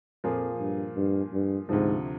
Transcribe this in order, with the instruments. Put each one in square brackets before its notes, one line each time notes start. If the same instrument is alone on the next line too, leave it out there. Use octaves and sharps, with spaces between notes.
[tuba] F2 [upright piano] A#2 F3 A#3 F4 G#4
[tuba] G2
G2
G2
[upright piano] D2 C3 F3 [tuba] G#2